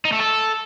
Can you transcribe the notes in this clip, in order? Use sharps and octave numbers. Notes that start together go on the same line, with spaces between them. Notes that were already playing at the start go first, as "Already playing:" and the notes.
D#4
A3
A4